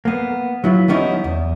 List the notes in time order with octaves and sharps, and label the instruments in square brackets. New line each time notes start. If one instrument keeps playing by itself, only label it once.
[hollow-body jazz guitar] A#3 B3
F#3 E4 F4
E3 G3 B3 C#4 D#4 E4
E2